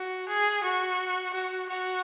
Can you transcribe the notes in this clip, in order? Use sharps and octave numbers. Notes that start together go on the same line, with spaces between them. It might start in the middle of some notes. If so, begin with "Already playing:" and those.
Already playing: F#4
G#4
F#4
F#4
F#4